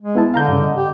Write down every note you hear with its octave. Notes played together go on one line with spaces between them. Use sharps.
G#3
B3 E4 A5
D3 F5 A#5 G6
G2 C#3
D#5
G4